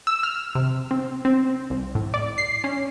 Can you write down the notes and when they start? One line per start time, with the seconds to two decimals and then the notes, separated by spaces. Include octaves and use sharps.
0.07 E6
0.23 F6
0.55 C3
0.91 C4
1.25 C4
1.70 C2
1.95 A2
2.14 D5
2.38 C7
2.64 C#4